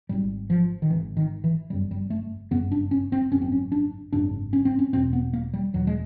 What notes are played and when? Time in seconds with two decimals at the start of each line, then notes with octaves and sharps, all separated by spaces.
0.09 G#1 G#2 G3
0.50 F3
0.82 D#3
0.90 G#1 E3
0.94 G#2
1.17 D#3
1.44 E3
1.70 G1 F#2 C#3 G3
1.91 G3
2.10 A3
2.51 G1 F#2 C#3 B3
2.72 D4
2.91 C#4
3.12 C4
3.31 G#1 F#2 C#3 C#4
3.42 C4
3.52 C#4
3.72 D4
4.13 G#1 F#2 C#3 D4
4.53 C#4
4.65 C4
4.79 C#4
4.93 E1 E2 B2 C4
5.13 B3
5.33 A#3
5.54 G3
5.73 E1 E2 B2 F#3
5.87 G#3